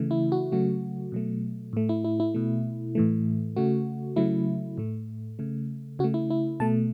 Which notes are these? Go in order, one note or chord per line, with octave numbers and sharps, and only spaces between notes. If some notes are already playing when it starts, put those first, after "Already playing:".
Already playing: C#3 E3 A3
E4
F#4
C#3 F#3 A3 F#4
B2 F#3 A3
A2 A3
E4
E4
E4
B2 A3
A2 E3 A3
C#3 A3 F#4
C#3 F#3 A3 E4
A2 A3
C#3 A3
C#3 A3 F#4
E4
E4
B2 A3 A5